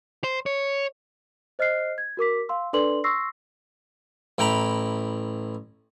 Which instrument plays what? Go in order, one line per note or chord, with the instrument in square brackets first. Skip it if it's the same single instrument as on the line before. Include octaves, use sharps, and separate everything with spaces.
[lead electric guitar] C5
C#5
[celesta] C5 D#5 F6 F#6 C7
G#6
F#4 A#4 D6 B6
F5 C6 E6
D4 A4 B4 D5 C6 F#7
C6 C#6 E6 A#6 C7
[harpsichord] A1 E4 G5 A#5 B5